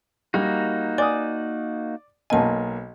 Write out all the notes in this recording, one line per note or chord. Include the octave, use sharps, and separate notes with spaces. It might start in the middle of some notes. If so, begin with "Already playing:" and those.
G3 A#3 D#4 F#4
D5 G#5 D#6
B1 A#3 D#5 G#5 A5